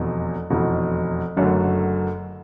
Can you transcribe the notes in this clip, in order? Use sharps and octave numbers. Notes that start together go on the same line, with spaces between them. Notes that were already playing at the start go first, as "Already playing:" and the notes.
Already playing: F1 E2 B2
F1 E2 B2
F#1 F#2 D3 F#3 A3